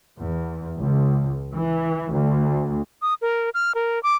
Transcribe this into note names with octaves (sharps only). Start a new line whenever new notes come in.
E2
C#2
E3
D2
D#6
A#4
F6
A#4
D6